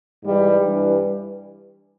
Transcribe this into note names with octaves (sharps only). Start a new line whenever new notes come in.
G#2 E3 G3
G2 E3 G3